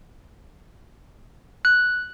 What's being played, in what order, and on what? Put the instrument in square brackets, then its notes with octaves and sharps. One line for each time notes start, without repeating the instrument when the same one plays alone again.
[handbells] F#6